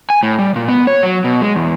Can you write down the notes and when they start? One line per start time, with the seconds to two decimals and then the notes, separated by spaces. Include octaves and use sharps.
0.10 G#5
0.23 A2
0.39 G3
0.56 A#2
0.69 B3
0.87 C#5
1.03 F#3
1.24 B2
1.41 G#3
1.55 E2